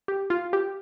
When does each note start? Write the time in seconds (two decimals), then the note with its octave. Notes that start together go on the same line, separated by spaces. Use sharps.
0.08 G4
0.30 F4
0.53 G4